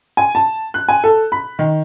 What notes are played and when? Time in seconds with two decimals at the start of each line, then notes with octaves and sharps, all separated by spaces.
0.17 G#5
0.35 A5
0.74 F#6
0.89 G#5
1.04 A4
1.32 B5
1.59 D#3